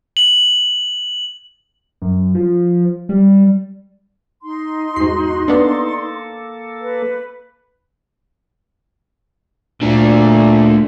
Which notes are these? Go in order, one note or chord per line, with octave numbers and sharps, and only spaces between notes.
F#7
F#2
F3
G3
D#4 C6
E2 G#2 F#4 C7
A#3 B3 D4 A4
B4
A#2 D3 A3